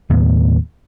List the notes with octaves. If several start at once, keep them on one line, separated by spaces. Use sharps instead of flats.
D#2 A2 B3